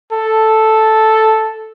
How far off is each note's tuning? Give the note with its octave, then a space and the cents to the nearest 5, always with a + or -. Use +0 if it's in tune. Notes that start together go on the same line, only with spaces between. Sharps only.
A4 +0